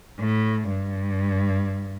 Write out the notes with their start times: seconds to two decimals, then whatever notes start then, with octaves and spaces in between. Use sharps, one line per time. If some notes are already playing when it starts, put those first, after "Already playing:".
0.20 A2
0.69 G2